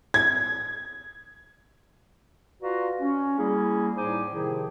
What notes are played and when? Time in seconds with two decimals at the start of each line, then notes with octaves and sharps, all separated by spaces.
0.14 G#6
2.62 F4 F#4 B4 D5 F5 A#5
3.00 C#4
3.38 G3 A#3 C#4 E4 G#4
3.97 A2 G3 D#4 C5 G#5 D6
4.32 C3 D#3 F3 E4 G#4